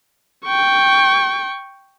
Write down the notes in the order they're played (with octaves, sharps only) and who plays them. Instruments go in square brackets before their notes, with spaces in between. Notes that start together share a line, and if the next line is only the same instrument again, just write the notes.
[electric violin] G5 C#6